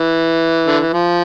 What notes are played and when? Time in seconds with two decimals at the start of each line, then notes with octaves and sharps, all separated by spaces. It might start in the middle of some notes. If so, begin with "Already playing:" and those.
Already playing: E3
0.67 D3
0.80 E3
0.93 F3